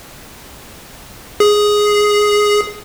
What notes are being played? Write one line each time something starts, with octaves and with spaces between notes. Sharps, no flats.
G#4